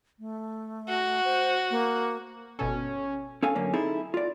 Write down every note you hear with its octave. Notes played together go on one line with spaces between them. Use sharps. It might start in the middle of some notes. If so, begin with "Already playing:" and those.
A3
F#4
C5
A#3
G1 B2 C#4 A4
C#4 A4 F5 G#5
F#2 D3 A#3 C#4
C4 D#4 E4 G#4 A4
F4 D5